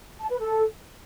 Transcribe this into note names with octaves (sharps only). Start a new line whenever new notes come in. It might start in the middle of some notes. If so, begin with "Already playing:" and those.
A5
B4
A4